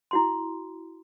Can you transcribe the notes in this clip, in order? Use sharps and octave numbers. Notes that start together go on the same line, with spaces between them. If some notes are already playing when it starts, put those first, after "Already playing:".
E4 F#4 C6